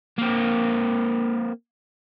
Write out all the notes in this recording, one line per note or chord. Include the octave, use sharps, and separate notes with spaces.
A#3 C4